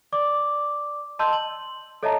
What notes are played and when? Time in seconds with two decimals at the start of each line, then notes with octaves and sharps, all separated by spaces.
0.12 D5 D6
1.19 D#5 A5 C6 E6 G6
1.33 F#7
2.03 A4 C#5 D#5 E5 A5 A#5